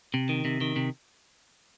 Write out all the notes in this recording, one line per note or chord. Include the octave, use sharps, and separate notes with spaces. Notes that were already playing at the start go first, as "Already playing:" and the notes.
C3
D#3
C3
D#3
C3